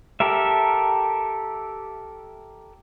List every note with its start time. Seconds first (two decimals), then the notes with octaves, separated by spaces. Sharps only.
0.20 G4 A4 A#4 E5